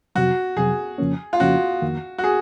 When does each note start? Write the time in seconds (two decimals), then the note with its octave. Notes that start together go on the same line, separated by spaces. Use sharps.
0.15 F2 C3 F#3 F#4
0.57 F2 C3 F#3 G#4
0.98 F2 C#3 F3 A#3 C#4
1.33 F4
1.40 F2 C#3 F3 A#3 C#4 F#4
1.82 F2 D#3 A#3
2.18 F#4
2.24 G#4